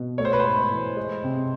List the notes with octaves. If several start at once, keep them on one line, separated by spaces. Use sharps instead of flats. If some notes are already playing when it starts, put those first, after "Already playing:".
Already playing: B2
A3 C#5
C5
B4
G#2 C5
E3
G#3
C3